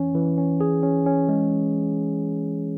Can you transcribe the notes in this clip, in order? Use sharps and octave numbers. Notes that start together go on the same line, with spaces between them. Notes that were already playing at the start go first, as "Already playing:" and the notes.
Already playing: E3 C#4
E3
C#4
G#4
C#4
C#4
G#3